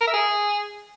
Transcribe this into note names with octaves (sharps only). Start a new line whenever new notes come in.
A#4
E5
G#4